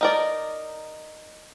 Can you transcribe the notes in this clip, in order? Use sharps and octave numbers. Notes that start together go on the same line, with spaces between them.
D#4 A#4 D5